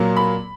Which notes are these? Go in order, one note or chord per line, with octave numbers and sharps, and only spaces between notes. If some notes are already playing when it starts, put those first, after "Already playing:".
Already playing: A#2 F#3 A#3
B5